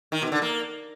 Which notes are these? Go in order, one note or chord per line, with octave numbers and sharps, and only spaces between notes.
D#3
B2
D3
A#3